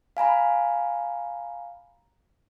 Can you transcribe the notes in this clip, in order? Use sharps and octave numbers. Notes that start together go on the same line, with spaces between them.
F5 G#5 A#5 B5